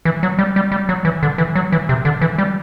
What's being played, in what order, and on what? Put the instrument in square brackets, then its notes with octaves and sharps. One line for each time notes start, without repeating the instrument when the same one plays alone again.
[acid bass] E3
F#3
G3
G3
G3
F#3
E3
D3
E3
F#3
E3
C3
D3
E3
G3